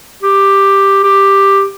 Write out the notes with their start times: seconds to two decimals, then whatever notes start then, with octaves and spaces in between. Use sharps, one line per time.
0.23 G4
1.04 G4